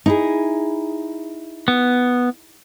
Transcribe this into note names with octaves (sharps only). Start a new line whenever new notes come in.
D#4 E4 G#4
B3